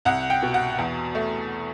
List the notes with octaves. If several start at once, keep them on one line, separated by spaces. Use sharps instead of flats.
C2 F#5
G5
B2
F#5
E2
A3